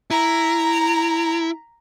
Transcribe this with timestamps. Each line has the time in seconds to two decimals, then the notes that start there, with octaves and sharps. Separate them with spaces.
0.11 E4 A#5